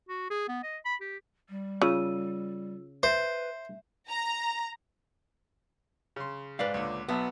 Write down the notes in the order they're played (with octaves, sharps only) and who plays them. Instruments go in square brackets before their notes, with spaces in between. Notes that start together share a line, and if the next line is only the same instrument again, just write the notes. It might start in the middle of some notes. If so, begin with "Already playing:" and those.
[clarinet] F#4
G#4
B3
D#5
B5
G4
[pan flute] G3
[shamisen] C#3 [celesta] F4 E6 D#7
[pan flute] B4 [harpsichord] C5 [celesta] E5
[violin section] A#5
[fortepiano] C#3 C6
[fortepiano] G#2 [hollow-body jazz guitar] B4 D5 F5
[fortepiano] C#2 A#2 D3
[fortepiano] B1 E5 A5 [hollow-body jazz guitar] B3